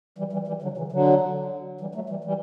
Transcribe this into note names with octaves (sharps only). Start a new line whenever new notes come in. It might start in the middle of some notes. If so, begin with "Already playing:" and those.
E3 G3
E3 G3
E3 G3
D3 F#3
C#3 E3
D3 F#3
E3 G3
F#3 A3
E3 G3
E3 G3